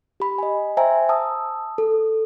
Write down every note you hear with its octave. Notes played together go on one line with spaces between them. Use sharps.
G4 B5
D#5 G#5
C5 E5 G5 G#5 A#5
A5 D#6 E6
A4